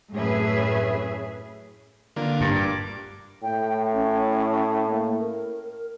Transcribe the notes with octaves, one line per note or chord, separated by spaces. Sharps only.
F#2 A2 C#4 G#4 B4 E5
D3 A#3 F4
G2
D6
A2 G5
C#4
A#3
A#4